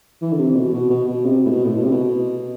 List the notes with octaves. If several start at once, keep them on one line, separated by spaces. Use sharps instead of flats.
E3
D3
C3
B2
B2
B2
B2
C3
A2
B2
A2
B2
C3
B2